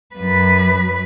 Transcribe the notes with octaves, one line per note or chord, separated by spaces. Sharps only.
F#2 B4